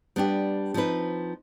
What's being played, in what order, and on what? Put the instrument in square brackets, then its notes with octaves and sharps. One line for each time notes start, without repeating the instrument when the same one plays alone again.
[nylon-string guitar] G3 B3 D4 G4
F3 C4 D#4 B4